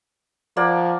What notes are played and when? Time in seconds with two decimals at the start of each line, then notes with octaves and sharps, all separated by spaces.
0.57 F3 A#3 D5 F#5